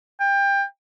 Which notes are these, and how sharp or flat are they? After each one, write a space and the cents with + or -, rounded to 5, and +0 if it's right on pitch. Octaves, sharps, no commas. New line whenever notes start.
G5 +25